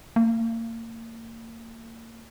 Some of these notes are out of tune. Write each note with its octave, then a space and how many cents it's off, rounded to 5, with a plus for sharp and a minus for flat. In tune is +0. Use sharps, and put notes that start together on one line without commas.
A#3 -35